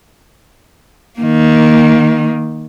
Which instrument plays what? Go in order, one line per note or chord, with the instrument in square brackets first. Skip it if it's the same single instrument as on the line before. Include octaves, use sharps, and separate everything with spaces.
[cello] D#3 A#3